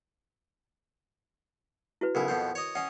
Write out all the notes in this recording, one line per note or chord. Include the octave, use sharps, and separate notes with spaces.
E4 F#4 B4
B1 C#3 E4 A#4
F2 B2 C4
C#5 D#5
C#4 D#5 F#5